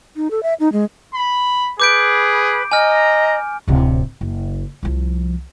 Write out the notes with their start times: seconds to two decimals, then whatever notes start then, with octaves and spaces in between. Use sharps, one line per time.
0.16 D#4
0.31 A4
0.43 E5
0.60 D#4
0.72 G#3
1.15 B5
1.80 G#4 B4 D6 G6 D7
2.72 D#5 G#5 A#5 F6
3.68 D1 C3
4.21 F#1
4.83 C2 F3